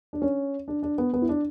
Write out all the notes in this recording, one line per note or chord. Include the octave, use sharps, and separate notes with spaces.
D4
C#4
D4
D4
B3
B3
E4
D4